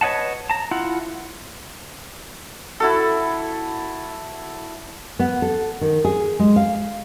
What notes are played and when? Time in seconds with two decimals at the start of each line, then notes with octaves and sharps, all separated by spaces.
0.01 B4 C#5 D#5 F#5 A5
0.50 A5 A#5
0.71 E4 F4 F#5
2.80 E4 F#4 A4
5.19 B3
5.42 A4
5.81 D#3
6.05 G#4
6.39 G#3
6.56 F5